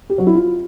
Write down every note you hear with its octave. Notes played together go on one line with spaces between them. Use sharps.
G4
F#3
E4
F4